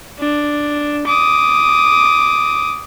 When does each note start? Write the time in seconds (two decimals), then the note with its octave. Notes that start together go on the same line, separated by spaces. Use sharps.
0.19 D4
1.07 D6 D#6